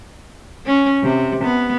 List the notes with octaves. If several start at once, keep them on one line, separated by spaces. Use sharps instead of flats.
C#4
C3
B3